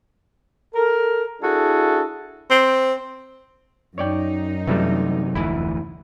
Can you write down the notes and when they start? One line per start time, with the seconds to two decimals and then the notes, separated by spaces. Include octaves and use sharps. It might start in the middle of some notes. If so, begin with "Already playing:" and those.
0.74 A4 A#4
1.42 D4 E4 F#4 G#4 A4
2.50 C4
3.98 F#2 D#4 C#5 D5 G5
4.67 C3 E3 F#3 G3 A3
5.35 F1 D2 E3 E4